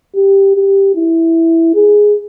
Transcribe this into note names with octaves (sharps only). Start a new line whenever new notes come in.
G4
G4
E4
G#4